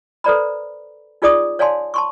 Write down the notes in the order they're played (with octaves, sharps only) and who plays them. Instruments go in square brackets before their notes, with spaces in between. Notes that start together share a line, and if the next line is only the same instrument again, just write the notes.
[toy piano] A4 B4 C5 D5 A#5 B5
D#4 F4 G#4 D5 D6 D#6
C#5 D5 F5 G#5 A5 C6
A5 C6 C#6